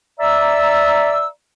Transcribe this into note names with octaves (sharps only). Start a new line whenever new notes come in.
D5 E5 A#5 E6